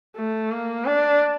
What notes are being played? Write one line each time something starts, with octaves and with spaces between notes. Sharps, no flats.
A3
A#3
D4